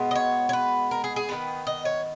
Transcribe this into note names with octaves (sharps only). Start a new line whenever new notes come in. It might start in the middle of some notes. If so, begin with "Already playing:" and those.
Already playing: B2 G#3 B3
D#5
C#5
C#5
B4
A#4
G#4
G#4
D#3 G#3 B3 B4
D#5
C#5